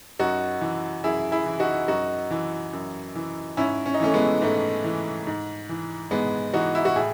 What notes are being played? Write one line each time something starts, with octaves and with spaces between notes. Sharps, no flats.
F#2 D#4 F#4
E3
F#2 E4 G#4
E4 G#4
E3
D#4 F#4
F#2 D#4 F#4
E3
F#2
E3
G#2 C#4 E4
C#4
D#4
E3 A3 C#4
G#3 B3
G#2 A3
E3
G#2
E3
G#2 G#3 B3
E3 D#4 F#4
E4
F#4
A2 E4 G#4